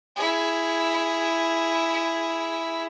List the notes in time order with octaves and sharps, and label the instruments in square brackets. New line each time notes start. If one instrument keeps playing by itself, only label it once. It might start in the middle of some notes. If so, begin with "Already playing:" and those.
[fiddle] E4 G#4